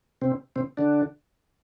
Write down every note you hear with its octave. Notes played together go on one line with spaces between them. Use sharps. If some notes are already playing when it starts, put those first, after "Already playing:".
C3 C4
C3 C4
D3 D4